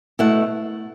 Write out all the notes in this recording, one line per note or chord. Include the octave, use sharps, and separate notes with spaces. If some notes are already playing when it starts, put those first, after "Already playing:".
B2 A3 E4 F#5